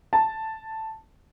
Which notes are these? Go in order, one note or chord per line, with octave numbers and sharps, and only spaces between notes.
A5